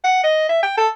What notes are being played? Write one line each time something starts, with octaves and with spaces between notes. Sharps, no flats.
F#5
D#5
E5
G5
A4